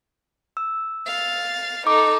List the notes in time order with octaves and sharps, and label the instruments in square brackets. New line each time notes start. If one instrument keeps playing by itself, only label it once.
[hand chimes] E6
[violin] F5 A6
[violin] D#4 A4 [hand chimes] D6